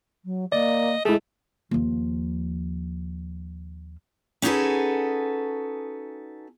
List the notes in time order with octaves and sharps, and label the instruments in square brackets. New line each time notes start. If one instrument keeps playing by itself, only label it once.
[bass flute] F#3
[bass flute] A#3 [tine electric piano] D5 [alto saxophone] D#5
[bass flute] G#3 [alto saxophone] A3 [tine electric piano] E4 G#4
[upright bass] D#2 F3
[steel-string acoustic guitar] C#4 D#4 F#4 G#4 A4 B4